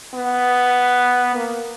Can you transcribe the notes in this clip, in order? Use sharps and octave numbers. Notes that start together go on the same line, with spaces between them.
B3
A#3